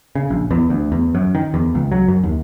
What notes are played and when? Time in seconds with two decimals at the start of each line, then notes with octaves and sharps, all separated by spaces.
0.15 C#3
0.30 A#1
0.51 E2
0.70 D2
0.92 E2
1.15 F#2
1.35 D#3
1.54 E2
1.75 C#2
1.92 F#3
2.08 F#2
2.23 D#2